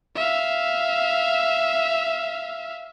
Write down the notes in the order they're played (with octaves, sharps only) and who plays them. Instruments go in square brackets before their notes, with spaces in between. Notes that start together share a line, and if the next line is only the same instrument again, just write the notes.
[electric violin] E5 F5